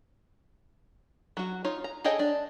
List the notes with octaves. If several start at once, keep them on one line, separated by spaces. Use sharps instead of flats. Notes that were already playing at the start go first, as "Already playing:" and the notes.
F#3 F#4
D#4 F4 C#5
A#5
G#4 A4 C#5 D#5 G5
D4